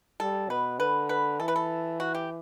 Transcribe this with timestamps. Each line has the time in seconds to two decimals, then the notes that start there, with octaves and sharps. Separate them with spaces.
0.20 G3 A4
0.49 B2 B4
0.79 D3 B4
1.09 B4
1.40 E3 A4
1.48 B4
1.56 A4
2.00 F#4
2.15 G4